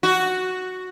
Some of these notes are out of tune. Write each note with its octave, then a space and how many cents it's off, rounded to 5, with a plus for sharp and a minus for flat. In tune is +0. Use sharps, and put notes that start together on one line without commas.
F#4 +0